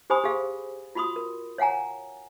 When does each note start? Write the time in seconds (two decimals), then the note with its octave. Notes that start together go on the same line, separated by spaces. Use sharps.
0.10 G4 C5 G#5 B5 D#6
0.24 G4 G#4 F5
0.95 F4 F#4 B5 C6 D#6
1.16 A#4
1.58 C#5 F5 F#5 G#5 A#5